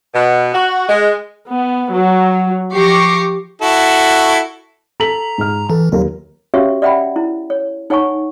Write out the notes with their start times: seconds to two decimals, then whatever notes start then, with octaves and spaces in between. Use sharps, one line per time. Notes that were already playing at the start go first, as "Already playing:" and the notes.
0.14 B2
0.54 F#4
0.88 G#3
1.51 B3
1.94 F#3
2.73 F3 G4 C#6 D6 A#6 C7
3.62 E4 F#4 A4
5.00 A4 A#5 B6 F#7
5.38 G#2 F6
5.70 E3 A4
5.92 D#2 F#3 A#4
6.54 C#4 F#4 G4 C#5 E5 F5
6.82 D5 E5 F#5 G5 B5
7.16 E4
7.50 C#5
7.90 D#4 C#5 F#5 G#5 A#5 C#6